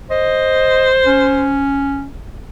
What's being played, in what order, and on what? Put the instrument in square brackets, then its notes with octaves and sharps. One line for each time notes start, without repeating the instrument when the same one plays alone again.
[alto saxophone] C5 [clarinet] D#5
[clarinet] C#4